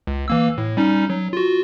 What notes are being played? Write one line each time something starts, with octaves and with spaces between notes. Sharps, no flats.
C#2
E3 A#3 E6
A2
G3 C#4 D#4
F#3
F4 F#4